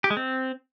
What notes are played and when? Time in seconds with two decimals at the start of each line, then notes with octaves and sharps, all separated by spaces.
0.04 G4
0.10 G#3
0.17 C4